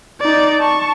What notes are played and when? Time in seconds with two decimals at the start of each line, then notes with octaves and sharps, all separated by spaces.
0.21 D#4 D5
0.60 A5 C#6